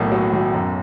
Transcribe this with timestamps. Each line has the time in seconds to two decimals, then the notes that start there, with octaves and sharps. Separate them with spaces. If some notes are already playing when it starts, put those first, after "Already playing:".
Already playing: B1 A2 A#3
0.12 F#3
0.33 B1
0.54 F#2